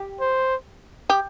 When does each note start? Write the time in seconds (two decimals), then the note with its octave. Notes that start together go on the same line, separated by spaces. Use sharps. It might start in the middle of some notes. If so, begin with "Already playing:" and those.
Already playing: G4
0.20 C5
1.10 G4